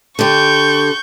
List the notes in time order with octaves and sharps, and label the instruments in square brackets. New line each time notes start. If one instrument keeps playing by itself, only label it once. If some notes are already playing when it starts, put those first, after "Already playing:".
[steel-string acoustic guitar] D3 G4 [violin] C#6 G6